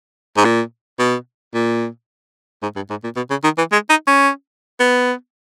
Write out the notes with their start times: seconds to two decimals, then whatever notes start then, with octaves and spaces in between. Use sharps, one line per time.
0.37 G#2
0.45 A#2
0.99 B2
1.54 A#2
2.62 G#2
2.76 G2
2.90 G#2
3.04 A#2
3.16 B2
3.30 C#3
3.44 D#3
3.58 E3
3.72 G#3
3.89 D#4
4.07 C#4
4.80 B3